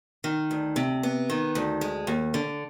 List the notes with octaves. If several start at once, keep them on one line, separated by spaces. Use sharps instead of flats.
D#3
D2
C3
B3
D#3
D2
G#3
D#2
D3